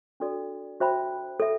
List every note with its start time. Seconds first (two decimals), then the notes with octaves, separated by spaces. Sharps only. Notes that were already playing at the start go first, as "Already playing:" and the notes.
0.20 D4 F#4 A4 D5
0.80 F#4 C5 E5 G5 B5
1.40 A4 E5